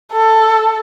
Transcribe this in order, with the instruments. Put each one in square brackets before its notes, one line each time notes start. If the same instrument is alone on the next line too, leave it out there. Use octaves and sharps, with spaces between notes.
[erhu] A4